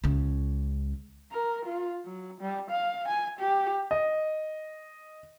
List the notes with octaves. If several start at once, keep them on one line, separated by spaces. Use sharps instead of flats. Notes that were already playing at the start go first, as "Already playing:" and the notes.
C#2 C#3
A#4
F4
F#3
G3
F5
G#5
G4
D#5